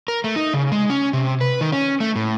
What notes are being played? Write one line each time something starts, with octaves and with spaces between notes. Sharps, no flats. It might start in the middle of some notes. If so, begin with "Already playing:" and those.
A#4
A3
D#4
C#3
G#3
C#4
C3
B4
D#3
C#4
A3
A2